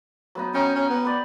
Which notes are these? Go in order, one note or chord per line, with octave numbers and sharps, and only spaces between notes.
F#3 B3 D#4
C#4 D#4 G5
C#4
B3
B4 D5